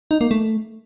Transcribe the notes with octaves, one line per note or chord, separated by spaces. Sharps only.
D#4
A#3
A3